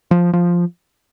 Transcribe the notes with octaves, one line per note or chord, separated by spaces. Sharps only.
F3
F3